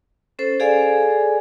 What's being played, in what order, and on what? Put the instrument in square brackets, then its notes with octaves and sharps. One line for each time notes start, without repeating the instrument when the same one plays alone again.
[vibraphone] C#4 A4 C5
G#4 A4 D5 F5 G#5